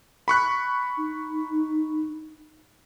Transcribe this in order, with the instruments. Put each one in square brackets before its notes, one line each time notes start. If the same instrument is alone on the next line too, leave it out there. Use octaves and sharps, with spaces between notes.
[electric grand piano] B5 C#6 F#6
[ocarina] D#4